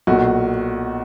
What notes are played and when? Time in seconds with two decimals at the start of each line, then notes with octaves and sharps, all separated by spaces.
0.07 B1 A#2 F#4